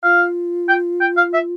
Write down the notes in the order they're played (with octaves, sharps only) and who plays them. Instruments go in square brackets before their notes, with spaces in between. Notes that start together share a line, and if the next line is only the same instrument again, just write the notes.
[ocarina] F4 [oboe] F5
[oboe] G5
G5
F5
E5